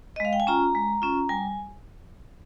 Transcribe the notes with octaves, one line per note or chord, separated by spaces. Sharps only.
D#5
G#3 F5
G5
G#5
C#4 F4 A#5
G#3
C#4 F4
G3 G#5